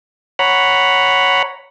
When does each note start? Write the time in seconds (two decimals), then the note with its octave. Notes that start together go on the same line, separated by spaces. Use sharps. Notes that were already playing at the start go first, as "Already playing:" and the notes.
0.39 C#5 F#5 A#5 B5